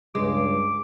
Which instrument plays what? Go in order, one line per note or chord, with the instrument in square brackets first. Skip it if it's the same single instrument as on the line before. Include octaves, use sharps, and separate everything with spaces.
[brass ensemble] C#2 G2 [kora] G#3 [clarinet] D6